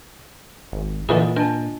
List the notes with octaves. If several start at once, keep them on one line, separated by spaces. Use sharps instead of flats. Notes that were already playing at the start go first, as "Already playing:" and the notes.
G#1
A#2 D3 E3 F4 G#4 D#5
D4 A#4 D#5 A5